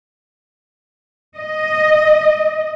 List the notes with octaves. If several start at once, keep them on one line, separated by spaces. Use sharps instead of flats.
D#5